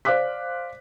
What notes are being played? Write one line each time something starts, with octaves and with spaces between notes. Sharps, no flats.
C5 D5 F5 D6 F#6 B6